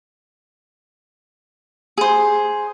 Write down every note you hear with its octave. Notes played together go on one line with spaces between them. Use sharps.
G#4 C5